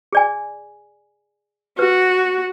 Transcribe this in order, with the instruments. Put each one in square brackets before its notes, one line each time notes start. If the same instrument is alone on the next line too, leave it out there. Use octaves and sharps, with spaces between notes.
[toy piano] G#4 D5 G#5
[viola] F#4 [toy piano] B4